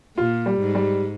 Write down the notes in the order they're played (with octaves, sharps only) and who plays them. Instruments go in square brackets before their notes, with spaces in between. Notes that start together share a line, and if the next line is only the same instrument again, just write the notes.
[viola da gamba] A#2 [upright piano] F4
[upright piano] G3
[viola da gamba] G#2
[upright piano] G3